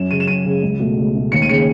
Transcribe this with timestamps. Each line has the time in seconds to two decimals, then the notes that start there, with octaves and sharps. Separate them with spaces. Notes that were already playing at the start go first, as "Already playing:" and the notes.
Already playing: F#2 E7
0.10 C#3 G#3 D#7
0.20 E7
0.28 F#2 D#7
0.45 C#3 G#3
0.63 C#2
0.80 B2 A3
0.97 C#2
1.15 B2 A3
1.32 D#2 C#7
1.42 D#7
1.49 C#3 G#3 C#7